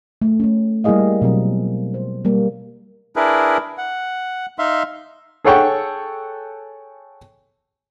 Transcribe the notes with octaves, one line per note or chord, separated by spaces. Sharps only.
A3
A3 C#4
G3 A#3 E4 G#4 D#5 F5
B2 F#3 C4 A#4
C5
G3 A#3
D4 E4 G#4 A#4 B4
F#5
D#4 E5 F5 C6
G#4 A4 C#5 F#5 G5 C#6